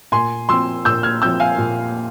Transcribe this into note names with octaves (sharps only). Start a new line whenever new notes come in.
A#2 G#5 C6
F3 C4 C6 E6
A#2 E6 G6
F6 G#6
F3 C4 E6 G6
F5 G#5
A#2